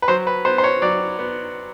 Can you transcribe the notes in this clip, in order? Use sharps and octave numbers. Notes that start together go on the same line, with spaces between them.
B4
F#3 C5
B4
B3 C5
C5
C#5
F#3 D5
B3